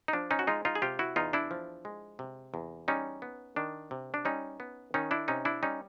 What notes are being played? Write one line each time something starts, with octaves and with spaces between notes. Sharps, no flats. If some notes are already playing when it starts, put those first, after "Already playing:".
D#4
F3 D4
C#4 D#4
F#4
G#3 D#4 F4
D#4 F4
G#4
C3 F4 G4
E4 F#4
E2 D#4 F4
D4 E4
F3
G#3
C3
E2
G3 C#4 D#4
B3
D#3 D4
C3
D4
G3 C#4 D#4
B3
D#3 C#4 D#4
D4 E4
C3 C#4 D#4
D4 E4
G3 C#4 D#4